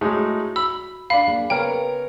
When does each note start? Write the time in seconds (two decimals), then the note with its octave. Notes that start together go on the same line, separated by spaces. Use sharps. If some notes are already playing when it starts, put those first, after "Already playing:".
0.01 A2 G#3 D#4 F#4 C#5 E5
0.56 B5 E6
1.10 D4 F5 B5
1.28 A#3 G#4
1.50 C#3 B3 A#4 B4 C#5 G5